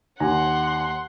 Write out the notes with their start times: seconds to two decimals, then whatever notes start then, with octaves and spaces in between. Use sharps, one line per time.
0.20 D#2 F#5 G#5 A#5 C6